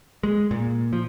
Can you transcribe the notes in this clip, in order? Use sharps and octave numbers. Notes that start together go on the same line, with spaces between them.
G#3
A#2
F3